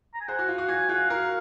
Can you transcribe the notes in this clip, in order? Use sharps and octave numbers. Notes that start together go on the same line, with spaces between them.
A#5
G#5
G#4 C5 F#5
F#4
F4
F#4
F#4 G#5
F4 G#4 F#5
F#4 A#4 F5